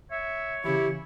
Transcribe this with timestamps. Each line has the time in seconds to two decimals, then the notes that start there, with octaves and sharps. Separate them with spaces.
0.11 C#5 E5
0.64 C#3 E3 E4 G4